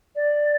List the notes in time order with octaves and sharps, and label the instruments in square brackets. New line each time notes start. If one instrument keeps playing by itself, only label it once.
[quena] D5